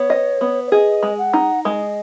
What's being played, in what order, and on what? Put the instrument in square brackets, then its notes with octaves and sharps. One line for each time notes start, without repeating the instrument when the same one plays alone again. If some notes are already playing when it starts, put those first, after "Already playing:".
Already playing: [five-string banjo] B3 [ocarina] C#5
[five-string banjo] D#5
B3
[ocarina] C#5
[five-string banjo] G#4 [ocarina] D#5
[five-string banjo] G#3
[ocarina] F#5
[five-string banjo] D#4
[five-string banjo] G#3 [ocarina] D#5